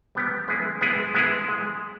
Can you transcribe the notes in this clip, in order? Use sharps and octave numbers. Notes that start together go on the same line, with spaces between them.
G3 B3 G4
G#3 B3 E4 G#4
G#3 B3 E4 G#4
G#3 B3 E4 G#4
G#3